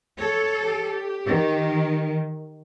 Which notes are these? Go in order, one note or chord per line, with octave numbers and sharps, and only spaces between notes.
A4 C#5
G4
D#3